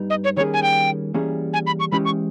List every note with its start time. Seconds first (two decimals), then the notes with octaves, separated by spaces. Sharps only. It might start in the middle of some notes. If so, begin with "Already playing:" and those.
Already playing: G2 G3 B3 D#4
0.10 D#5
0.24 C#5
0.37 D#3 G3 A#3 C#4 G#4 C#5
0.54 G#5
0.63 G5
1.14 E3 G3 A#3 C#4 G#4
1.54 G#5
1.67 B5
1.80 C#6
1.92 E3 G#3 C#4 G4 B5
2.05 C#6